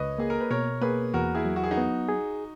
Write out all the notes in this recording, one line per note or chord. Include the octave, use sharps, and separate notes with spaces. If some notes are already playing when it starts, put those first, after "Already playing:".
Already playing: C#2 B4 C#5 D#5
A#3 G#4
A#4
B4
B2 A#4 C#5
A#3 G#4 B4
E2 F#4 A#4
E4 G#4
F#3
F#4
G#4
D#4 F#4
B3
G#4